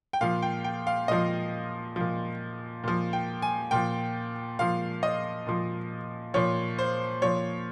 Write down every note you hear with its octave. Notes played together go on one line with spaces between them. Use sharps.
G5
A#2 F3 F5
G5
G5
F5
A#2 F3 D#5
A#2 F3
A#2 F3
G5
G#5
A#2 F3 G5
A#2 F3 F5
D#5
A#2 F3
A#2 F3 C#5
C5
A#2 F3 C#5